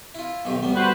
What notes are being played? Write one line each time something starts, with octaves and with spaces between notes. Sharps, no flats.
E4 F4
B1 D#3 G4
D2 G3 B3
F#4 B4 C5